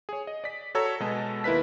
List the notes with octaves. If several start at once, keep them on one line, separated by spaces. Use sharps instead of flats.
G#4 C#5
D#5
D5 B6
F#4 A4 C#5 A#5 E6
B2 G#3 A4 D#5 A5
D#2 E4 A#4 B4 B6